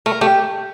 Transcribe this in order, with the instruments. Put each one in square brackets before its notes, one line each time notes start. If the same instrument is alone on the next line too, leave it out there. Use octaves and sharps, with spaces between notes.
[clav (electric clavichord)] A3 [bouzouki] A#4
[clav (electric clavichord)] A3 [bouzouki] G4